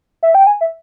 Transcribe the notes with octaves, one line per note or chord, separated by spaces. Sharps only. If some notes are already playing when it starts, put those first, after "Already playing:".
E5
G5
G#5
E5